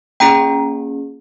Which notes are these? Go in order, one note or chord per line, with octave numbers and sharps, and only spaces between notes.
A#3 C#4 F4 G#4 G5 A#5